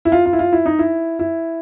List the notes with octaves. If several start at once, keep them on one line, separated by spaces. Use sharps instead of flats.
E4
F4
F4
E4
F4
E4
D#4
E4
E4